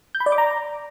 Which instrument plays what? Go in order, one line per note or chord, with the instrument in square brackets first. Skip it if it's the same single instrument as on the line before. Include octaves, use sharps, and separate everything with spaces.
[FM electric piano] G6
B5
D5
D6
A#5